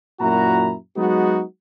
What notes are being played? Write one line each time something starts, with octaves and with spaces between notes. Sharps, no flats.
F#2 A#2 E4 F#4 A#5
F#3 G#3 B3 D#4 F#4